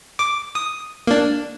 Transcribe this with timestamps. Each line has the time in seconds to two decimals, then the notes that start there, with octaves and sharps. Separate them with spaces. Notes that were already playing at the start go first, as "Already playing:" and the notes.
0.19 D6
0.55 D#6
1.07 A#3 D4